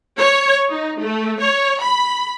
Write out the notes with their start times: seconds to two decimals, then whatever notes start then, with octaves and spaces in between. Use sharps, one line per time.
0.19 C#5
0.70 D#4
0.99 A3
1.40 C#5
1.81 B5